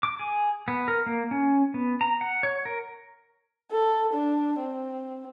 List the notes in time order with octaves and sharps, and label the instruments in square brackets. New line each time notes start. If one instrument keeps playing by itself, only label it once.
[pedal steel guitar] D6
G#4
B3
A#4
A#3
C#4
B3
A#5
F#5
C#5
A#4
[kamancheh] A4
D4
C4